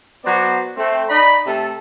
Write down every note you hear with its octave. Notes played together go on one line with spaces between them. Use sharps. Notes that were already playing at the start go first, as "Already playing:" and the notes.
F#3 B3 F#4 C5 D5
A3 C4
D#4 D5 B5
C3 A3 A4